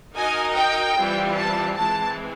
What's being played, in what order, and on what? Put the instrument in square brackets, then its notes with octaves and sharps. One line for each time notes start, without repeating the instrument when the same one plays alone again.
[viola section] D#4 F#4 A#4 D#5 [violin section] G#5
[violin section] G5
[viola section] E3 G3 C4 F4
[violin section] A5
[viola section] E3 G#3 C4 [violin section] A5